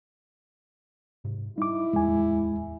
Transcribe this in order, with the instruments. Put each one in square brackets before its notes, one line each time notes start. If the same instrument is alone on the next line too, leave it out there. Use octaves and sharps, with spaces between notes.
[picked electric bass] G#2 C3
[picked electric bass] G3 [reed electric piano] D#4 D6 [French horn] E4
[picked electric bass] D1 E2 [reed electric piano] G#3 G#5